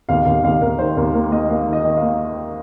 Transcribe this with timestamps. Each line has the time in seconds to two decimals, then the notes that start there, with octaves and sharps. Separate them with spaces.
0.09 D#2 F5
0.26 D#2 F5
0.43 D#2 F5
0.61 D#2 A#4
0.78 D#3 C5
0.97 D#2 A#4
1.14 A#3 A#4
1.32 A#3 D#5
1.50 A#3 F5
1.67 D#3
1.73 D#5
1.85 D#3
1.97 F5
2.02 A#3